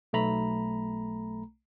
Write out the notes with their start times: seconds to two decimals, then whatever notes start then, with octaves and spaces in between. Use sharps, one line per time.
0.13 B1 A3 A#5 B5